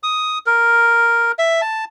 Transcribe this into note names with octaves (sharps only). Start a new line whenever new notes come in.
D#6
A#4
E5
A5